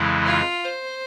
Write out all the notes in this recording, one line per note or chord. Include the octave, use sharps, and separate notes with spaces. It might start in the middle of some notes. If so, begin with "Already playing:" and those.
Already playing: F2 C#3 E3 G#3 E4
F4
C5